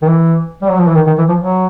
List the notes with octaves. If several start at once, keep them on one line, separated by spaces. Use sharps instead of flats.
D#3
E3
G3
F#3
F3
E3
D#3
D#3
E3
F3
F#3